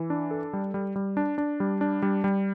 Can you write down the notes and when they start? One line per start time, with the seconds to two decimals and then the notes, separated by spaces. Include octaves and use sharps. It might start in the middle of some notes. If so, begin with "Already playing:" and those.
Already playing: E3
0.10 D4
0.31 A4
0.53 G3
0.74 G3
0.96 G3
1.17 D4
1.38 D4
1.60 G3
1.81 D4
2.02 G3
2.24 G3